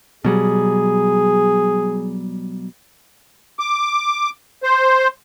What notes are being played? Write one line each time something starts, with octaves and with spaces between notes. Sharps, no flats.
B2 F#3 G3 G#4
D6
C5